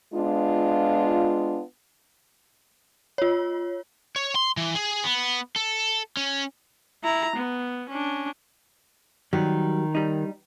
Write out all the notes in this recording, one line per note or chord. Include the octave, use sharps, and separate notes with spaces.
G#3 B3 D4 F4
F4 C#5
C#5
C6
E3
G#4
B3
A4
C#4
E4 A#5
B3
C#4 D4
D#3 F#3 G3
G3 D#4